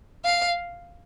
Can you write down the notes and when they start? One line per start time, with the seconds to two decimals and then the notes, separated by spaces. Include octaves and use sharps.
0.25 F5